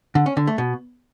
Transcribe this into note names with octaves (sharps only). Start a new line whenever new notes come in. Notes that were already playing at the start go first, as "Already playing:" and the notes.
D3
C#4
D3
A3
B2